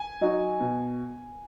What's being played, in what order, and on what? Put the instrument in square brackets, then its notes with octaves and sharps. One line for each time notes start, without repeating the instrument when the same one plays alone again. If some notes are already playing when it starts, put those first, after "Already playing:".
Already playing: [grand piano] G#5
[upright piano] F#3 D#4 F#4
B2